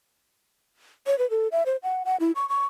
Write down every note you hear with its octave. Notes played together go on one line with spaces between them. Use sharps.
C#5
B4
A4
E5
C5
F#5
F#5
E4
C#6
C#6